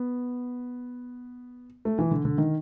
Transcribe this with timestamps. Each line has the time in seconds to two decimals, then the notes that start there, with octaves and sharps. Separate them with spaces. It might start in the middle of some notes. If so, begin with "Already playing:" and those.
Already playing: B3
1.85 A3
1.99 E3
2.11 D3
2.25 D3
2.38 D#3